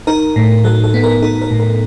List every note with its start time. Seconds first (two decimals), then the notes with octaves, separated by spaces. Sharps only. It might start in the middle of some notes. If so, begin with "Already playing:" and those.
0.07 D#4 A#4
0.36 A2
0.64 F#3 A4
0.84 A4
0.94 B3
1.04 A#4
1.22 D#4 A4
1.42 A#4
1.51 A2
1.60 A#4